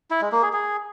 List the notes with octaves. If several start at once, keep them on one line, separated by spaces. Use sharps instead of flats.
E4
G#3
A#3
G#4
G#4